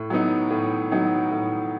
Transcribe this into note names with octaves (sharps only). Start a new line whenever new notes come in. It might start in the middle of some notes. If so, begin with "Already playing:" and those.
Already playing: A2
F#3 B3 D#4
A2
F#3 B3 D#4
A2